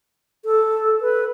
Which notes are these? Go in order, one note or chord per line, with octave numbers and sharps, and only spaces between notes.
A4
B4